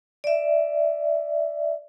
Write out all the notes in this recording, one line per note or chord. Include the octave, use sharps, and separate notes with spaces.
D5 E5